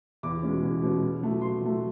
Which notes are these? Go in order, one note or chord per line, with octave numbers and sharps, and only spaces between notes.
E2 D6
B2 G#3 C#4
E2
B2 G#3 C#4
B2
F#3 A3
B2 C6
F#3
A3